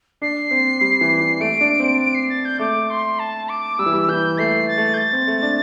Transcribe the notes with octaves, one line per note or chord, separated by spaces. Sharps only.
D4 C7
C4
G3
E3
E3
A3 D7
D4
C4
D7
C7
A6
G6
A3 D6
C6
A5
D6
G3 E6
E3
G3
E3 G6
A3 C7
A6
A3
G6
A6
C4
A3
D4